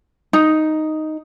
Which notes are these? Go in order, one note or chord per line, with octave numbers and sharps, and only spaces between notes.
D#4